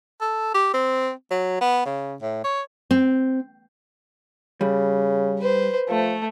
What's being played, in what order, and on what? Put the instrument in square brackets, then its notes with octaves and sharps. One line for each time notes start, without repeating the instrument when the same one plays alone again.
[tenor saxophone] A4
G4
C4
F#3
B3
C#3
A2
C#5
[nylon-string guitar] C4
[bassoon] C#3 [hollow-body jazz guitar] G3
[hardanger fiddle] B4 C5
[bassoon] F3 [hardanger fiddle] A3